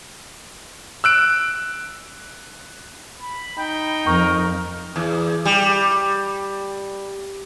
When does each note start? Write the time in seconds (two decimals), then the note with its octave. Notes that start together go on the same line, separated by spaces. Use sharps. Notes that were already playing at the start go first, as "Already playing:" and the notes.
1.04 E6 F#6 D7
3.18 B5
3.58 D#4 G5
4.07 F2 A#4 C#6
4.96 E2
5.45 G3